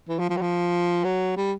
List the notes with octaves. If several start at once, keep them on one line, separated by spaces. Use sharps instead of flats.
E3
F3
F3
F#3
F3
F#3
G3